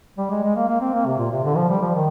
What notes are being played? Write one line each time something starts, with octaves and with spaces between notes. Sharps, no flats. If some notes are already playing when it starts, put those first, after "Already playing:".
G3
G#3
G#3
A#3
A#3
C4
A#3
C3
A#2
C3
D3
F3
G3
F3
D#3